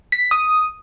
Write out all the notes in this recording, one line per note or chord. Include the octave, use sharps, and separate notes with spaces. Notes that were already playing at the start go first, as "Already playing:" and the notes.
B6
D#6